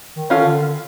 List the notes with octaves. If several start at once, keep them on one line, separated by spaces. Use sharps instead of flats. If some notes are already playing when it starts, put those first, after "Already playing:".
D#3
D#3 C#4 F4 A4
D3